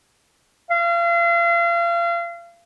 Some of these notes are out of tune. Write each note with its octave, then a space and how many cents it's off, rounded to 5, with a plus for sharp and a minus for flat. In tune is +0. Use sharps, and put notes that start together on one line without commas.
F5 -35